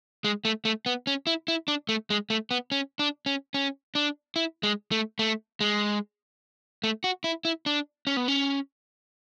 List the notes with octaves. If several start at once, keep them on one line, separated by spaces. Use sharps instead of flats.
G#3
A3
A3
B3
C#4
E4
E4
D4
A3
G#3
A3
B3
C#4
D4
C#4
C#4
D4
E4
G#3
A3
A3
G#3
A3
F#4
E4
E4
D4
C#4
B3
C#4